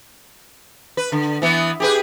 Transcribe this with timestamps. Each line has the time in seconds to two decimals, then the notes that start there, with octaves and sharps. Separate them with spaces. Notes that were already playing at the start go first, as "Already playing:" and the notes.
0.97 B4
1.12 D3
1.42 E3 B3
1.80 G4 G#4 B4